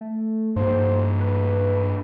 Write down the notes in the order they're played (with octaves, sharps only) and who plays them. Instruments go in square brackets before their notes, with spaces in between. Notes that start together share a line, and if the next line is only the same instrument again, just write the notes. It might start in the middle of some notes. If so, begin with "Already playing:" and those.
[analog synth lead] A3
[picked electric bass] G2 A#3 [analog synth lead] C5
[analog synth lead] B4